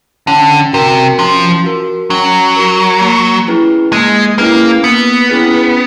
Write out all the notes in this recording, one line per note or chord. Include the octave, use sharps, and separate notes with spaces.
D3 C#4
C3 F#4 A#4
F3 C#4
F#4 A#4
F#3 C#4
F#4 A#4
A#3
C#4 E4 G#4 B4
G#3 A#3
A#3 C#4 E4 G#4 B4
A#3 B3
C#4 E4 G#4 B4